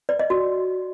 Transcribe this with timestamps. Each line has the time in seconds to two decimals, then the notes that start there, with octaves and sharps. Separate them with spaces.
0.09 D5
0.19 D#5
0.30 F#4